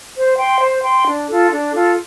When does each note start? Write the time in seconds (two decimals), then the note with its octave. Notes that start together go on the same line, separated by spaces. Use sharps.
0.16 C5
0.37 G5 C6
0.59 C5
0.82 G5 C6
1.05 D4
1.27 F4 A4
1.50 D4
1.73 F4 A4